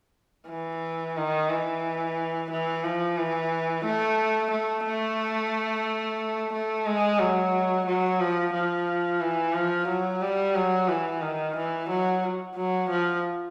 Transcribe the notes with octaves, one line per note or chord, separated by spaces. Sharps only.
E3
D#3
E3
E3
F3
E3
A3
A3
A3
A3
G#3
F#3
F#3
F3
F3
E3
F3
F#3
G3
F#3
E3
D#3
E3
F#3
F#3
F3